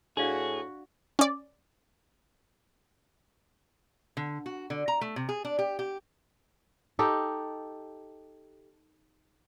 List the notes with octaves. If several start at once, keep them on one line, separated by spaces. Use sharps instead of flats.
A2 D4 F#4 G#4 D5 F5
C#4 D5
D3
F#4
D3
A#5
A3
C3
G#4
D4
G4
G4
D#4 G4 A4